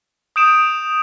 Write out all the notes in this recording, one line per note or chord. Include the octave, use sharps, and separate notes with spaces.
D#6 G6 D7 E7